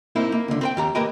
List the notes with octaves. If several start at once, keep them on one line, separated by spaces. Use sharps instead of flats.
A#3 C4 D#4 E4
A#3
C#2 D3
C4 B4 G5
D#2 G4 A#5
A#3 G4 A#4 B4 D#5 G5